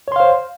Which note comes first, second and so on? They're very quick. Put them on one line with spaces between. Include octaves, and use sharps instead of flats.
C#5 C6 F5 C5